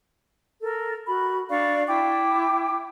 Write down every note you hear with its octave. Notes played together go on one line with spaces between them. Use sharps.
A4 A#4
F#4 B5
D4 D5 F5 C#6
E4 G5 D6